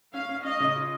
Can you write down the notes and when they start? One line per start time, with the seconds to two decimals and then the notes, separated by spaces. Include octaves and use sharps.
0.14 C#4 F5
0.29 C#4
0.44 C#4 D#5
0.60 C#3
0.75 F4